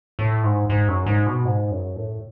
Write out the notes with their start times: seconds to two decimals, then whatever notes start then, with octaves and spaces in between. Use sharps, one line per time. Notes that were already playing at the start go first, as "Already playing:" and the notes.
0.19 A2
0.43 G#2
0.69 G#2
0.88 F#2
1.06 G#2
1.27 B2
1.45 G#2
1.71 F#2
1.96 A2